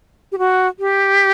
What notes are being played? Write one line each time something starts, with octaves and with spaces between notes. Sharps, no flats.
G4
F#4
G4